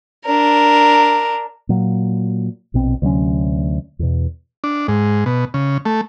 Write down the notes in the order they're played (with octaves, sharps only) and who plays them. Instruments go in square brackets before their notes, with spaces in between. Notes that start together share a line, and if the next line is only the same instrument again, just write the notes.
[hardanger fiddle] D4 A#4
[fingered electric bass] A#2 F#3
A#1 B2 C4
D2 C3 F#3 C#4
E2 B2
[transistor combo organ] D4
G#2
B2
C#3
A3